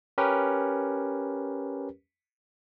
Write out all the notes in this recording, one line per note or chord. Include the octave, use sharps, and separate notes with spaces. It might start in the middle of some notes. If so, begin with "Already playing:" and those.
C#4 G4 A#4 B4